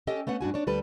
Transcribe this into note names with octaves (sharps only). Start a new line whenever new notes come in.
C#4 G4 A4 D#5 G5
A3 B3 C#4 F#5
G2 D4 F#4 G#5
D4 C#5
D2 G3 A4 B4